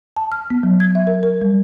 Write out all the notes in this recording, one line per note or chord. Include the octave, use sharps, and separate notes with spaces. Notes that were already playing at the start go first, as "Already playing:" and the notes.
A5
F6
B3
F#3
G#6
E5
A#4
A#4
G3